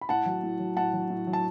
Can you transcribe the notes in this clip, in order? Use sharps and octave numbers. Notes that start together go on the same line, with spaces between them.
B5
A2 F#5 A5
F#3
A2
F#3
A2 F#5 A5
F#3
A2
F#3
A5